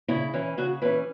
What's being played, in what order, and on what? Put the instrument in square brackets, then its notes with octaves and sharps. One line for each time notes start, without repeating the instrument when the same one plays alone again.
[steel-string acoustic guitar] C#3 E4
E3 C#4
C#3 F#4
E3 C#4 B4